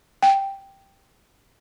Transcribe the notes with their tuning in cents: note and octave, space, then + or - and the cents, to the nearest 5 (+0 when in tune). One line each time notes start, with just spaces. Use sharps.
G5 +0